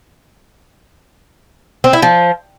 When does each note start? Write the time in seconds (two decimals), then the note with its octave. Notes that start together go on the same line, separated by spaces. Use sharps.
1.84 C4
1.93 E4
2.02 F3